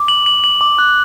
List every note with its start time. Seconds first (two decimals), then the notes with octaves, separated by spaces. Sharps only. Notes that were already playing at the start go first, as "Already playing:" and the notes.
Already playing: D6
0.08 F#7
0.26 F#7
0.44 F#7
0.61 D6
0.78 F#6